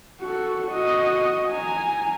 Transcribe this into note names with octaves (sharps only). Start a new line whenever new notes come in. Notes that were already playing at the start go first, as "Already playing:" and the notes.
F#4 A4
F#4 D#5
G#5 A#5